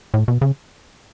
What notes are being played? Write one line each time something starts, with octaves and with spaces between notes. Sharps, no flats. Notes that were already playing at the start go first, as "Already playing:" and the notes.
A2
B2
C#3